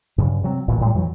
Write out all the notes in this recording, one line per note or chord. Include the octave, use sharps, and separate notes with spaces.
G2 C#3 F#3
C3 F#3 G3 C4
A1 D2 A#2
A2 G3
F2 E3 F#3